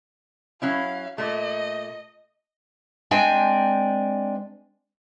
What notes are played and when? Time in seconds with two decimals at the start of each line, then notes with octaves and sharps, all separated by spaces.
0.62 F#3 C#4 E4 F5
1.18 A#2 A3 D#5
3.11 G#3 C4 D4 G5 G#5